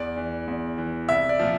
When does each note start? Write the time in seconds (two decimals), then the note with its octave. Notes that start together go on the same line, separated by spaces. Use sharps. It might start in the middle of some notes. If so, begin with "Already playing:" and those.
Already playing: E2 D5
0.17 E3
0.48 E2
0.78 E3
1.09 C2 E5
1.29 D5
1.39 A#2 F3